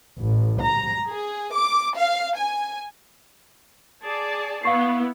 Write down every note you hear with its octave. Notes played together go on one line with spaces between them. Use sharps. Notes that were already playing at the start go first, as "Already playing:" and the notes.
A1
A#5
G#4
D6
F5
G#5
G#4 D5 A5
B3 E4 F5 C#6 C7